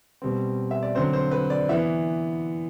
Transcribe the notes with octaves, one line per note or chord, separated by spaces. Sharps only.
B2 G3 C4
E5
D5
D3 F#3 C4 C5
C5
B4
D5
E3 B3 E5